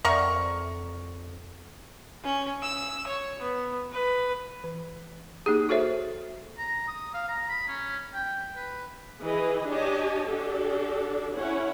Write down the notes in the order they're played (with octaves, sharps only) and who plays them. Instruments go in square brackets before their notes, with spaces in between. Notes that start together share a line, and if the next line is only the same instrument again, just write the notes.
[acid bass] F2 [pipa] A#4 C#6 [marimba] D5 E5 F#5
[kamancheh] C#4
E6
C#5
B3
B4
[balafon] E3
A#3 D#4 G4 G#4
F#4 A4 C5 C#5 E5
[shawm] A#5
D#6
F5
A#5
B5
C#4
G5
B4
[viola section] E3 G#4 B4 D#5
D4 G4 C#5 D#5 G#5 A5
D4 F#4 G4 A4
C#4 E4 C#5 F#5